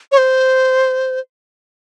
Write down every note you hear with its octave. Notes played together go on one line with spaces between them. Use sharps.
C#5
C5